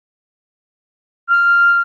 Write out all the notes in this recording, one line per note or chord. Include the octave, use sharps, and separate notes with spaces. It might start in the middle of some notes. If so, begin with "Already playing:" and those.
F6